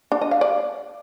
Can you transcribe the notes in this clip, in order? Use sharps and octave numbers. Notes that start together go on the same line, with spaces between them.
D4
D#5
F5
D5